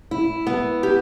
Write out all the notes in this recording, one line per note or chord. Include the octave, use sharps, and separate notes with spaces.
E4
B3
G4